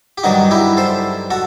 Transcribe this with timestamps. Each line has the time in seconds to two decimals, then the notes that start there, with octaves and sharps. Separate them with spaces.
0.18 G4
0.24 G2 D#3 F#3 D#4 F#4
0.51 E4 G4
0.77 A4 C5
1.31 F#4 A4